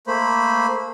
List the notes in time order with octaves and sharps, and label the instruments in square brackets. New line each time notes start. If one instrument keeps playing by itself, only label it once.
[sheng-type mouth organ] A3 A#3 C5 B5